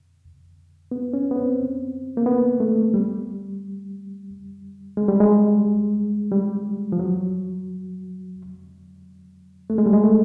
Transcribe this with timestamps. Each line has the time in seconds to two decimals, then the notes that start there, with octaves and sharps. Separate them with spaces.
0.91 B3
1.13 C#4
1.31 B3
1.36 C4
2.17 A#3
2.26 B3
2.60 A3
2.94 G3
4.97 G#3
5.08 G3
5.20 G#3
6.31 G3
6.92 F3
6.99 F#3
9.70 A3
9.78 G#3
9.86 G3
9.93 G#3
10.04 A3